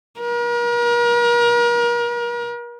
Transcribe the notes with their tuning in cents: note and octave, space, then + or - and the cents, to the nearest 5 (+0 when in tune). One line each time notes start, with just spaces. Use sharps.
A#4 +40